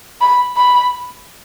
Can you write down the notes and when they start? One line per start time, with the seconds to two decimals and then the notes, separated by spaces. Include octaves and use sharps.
0.21 B5
0.57 B5